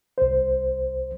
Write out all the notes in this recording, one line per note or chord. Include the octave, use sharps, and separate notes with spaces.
C2 C5